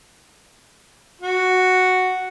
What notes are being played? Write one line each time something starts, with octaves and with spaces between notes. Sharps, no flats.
F#4